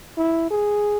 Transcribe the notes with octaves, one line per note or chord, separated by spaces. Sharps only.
E4
G#4